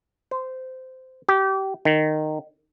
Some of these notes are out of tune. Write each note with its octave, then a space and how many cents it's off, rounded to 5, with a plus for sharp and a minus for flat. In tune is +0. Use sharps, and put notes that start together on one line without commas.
C5 -15
G4 -25
D#3 -15